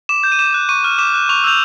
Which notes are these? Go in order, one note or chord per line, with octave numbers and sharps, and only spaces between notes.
D6 E7
G6
D#7
D6 E7
F#6
C#6 D#7
F6
D6 E7
F#6
C#6 F7
E6 G6 F7